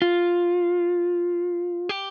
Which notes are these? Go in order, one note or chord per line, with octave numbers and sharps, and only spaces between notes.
F4
G4